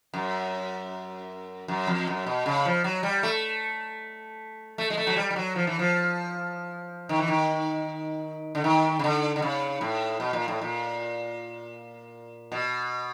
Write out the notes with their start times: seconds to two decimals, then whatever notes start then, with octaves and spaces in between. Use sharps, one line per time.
0.14 F#2
1.68 F#2
1.87 F2
2.07 F#2
2.27 B2
2.46 C#3
2.65 F3
2.84 F#3
3.03 G3
3.23 A3
4.78 A3
4.90 G#3
4.97 A3
5.07 F#3
5.17 G3
5.30 G3
5.36 F#3
5.56 F3
5.67 E3
5.79 F3
7.09 D#3
7.19 E3
7.28 D#3
8.55 D3
8.64 D#3
8.99 C#3
9.04 D3
9.36 D3
9.42 C#3
9.81 A2
10.20 B2
10.33 A#2
10.48 A2
10.62 A#2
12.52 B2